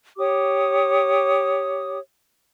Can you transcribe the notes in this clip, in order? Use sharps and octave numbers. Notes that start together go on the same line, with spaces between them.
G4 C#5 D6 D#6